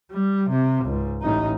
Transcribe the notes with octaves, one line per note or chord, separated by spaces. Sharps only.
G3
C3
C#2 G#2
A1 D#4